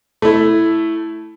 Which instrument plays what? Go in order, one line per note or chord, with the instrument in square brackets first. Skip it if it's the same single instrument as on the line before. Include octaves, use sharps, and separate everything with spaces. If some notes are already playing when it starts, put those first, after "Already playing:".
[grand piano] A3 E4